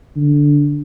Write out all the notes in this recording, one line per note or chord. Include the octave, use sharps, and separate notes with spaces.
D3